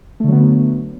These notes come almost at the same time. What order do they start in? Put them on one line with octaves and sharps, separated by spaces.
A3 D3 F#3 B3